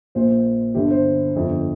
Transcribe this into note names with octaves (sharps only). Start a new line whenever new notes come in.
A#1 A#2 C5
G1 G2 D3 G4
C5
G1 F2 D3